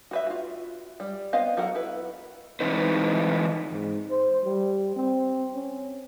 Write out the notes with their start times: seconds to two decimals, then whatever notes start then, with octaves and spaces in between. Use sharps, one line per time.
0.11 F#4 B4 E5
0.27 F4 F#4
1.00 G3
1.33 B3 C4 D#5 F5
1.57 F#3 F#4 A4 A#4 F#5
1.75 E4 B4
2.61 E3 G#3 C4 D#4 B4
3.72 G#2
4.10 C5
4.45 G3
4.96 C4
5.55 C#4